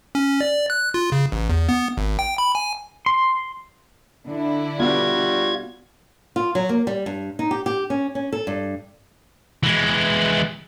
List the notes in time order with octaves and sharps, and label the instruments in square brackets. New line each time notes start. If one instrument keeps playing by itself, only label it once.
[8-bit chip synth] C#4
D5
F#6
F4
C#3
A1
E2
B3
G#1
G5
B5
G#5
[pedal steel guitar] C6
[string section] D3 D4 E4
[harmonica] G3 F#4 [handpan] B3 [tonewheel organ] F4 G#6
[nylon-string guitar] F4
F#3
A#3
G3
G2
D#4
G4
G4
C#4
C#4
A4
G2
[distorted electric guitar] E3 G#3